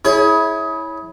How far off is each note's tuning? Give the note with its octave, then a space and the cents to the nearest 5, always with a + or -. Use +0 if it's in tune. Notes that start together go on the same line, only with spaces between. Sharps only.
E4 -20 G#4 +20 C#5 +0